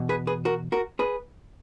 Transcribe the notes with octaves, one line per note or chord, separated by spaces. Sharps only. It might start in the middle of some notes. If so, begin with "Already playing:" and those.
Already playing: E2 B2
G#4 B4
G#4 B4
F#4 A#4
F#4 A#4
G#4 B4